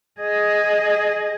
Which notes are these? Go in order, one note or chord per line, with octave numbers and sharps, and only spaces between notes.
G#4 D#5